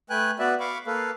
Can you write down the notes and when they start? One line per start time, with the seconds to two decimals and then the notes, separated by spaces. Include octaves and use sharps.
0.10 A3 B4 G5 G#5 F#6
0.39 B3 F#4 B4 D5 E5
0.60 F5 B5 C#6 D6
0.87 A#3 A4 B4 F5